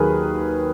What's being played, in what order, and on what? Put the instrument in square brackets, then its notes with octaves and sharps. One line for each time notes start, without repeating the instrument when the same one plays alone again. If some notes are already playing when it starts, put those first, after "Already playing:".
Already playing: [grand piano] D#2 D#3 F#3 G#4 A#4 B4